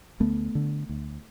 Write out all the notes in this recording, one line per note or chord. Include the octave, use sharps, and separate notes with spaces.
D2 A3 B3
D3
D2